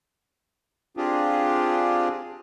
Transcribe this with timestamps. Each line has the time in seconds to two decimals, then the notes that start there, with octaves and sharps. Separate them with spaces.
0.97 C4 D4 F4 G4 G#4